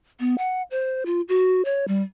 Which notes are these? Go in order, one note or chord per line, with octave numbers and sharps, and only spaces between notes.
B3
F#5
C5
F4
F#4
C#5
G3